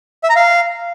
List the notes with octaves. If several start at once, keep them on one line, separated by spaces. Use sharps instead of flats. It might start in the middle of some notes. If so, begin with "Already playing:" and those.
E5
A#5
F5